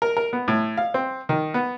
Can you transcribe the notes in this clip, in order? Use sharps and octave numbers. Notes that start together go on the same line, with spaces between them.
A#4
A#4
B3
A2
F5
C4
D#3
B3